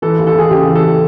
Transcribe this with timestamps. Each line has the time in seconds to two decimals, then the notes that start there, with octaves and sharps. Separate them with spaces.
0.02 E3 A4
0.18 D#2
0.27 A4
0.35 D#2 G#4
0.51 C#3 G4
0.67 E3
0.75 A4